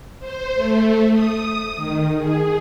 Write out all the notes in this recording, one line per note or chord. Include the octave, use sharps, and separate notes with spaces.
C5
A3
D#6
D#3
G#4